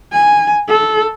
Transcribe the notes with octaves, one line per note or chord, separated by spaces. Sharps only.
G#5
A4